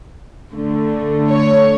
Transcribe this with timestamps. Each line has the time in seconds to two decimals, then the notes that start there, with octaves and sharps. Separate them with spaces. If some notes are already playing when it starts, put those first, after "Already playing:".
0.53 D3 A3
1.32 C#5